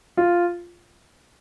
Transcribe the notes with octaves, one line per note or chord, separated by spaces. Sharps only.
F4